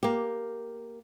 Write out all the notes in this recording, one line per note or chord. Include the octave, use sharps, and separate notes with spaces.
A#3 G4